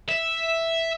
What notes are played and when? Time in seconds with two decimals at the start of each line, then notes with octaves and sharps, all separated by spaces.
0.09 E5